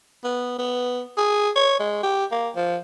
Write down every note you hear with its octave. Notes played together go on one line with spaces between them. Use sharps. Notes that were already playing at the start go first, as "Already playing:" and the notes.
B3
B3
G#4
C#5
G#3
G4
A#3
F3